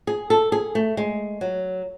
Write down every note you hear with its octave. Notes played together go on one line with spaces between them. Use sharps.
G#4
A4
G#4
A3
G#3
F#3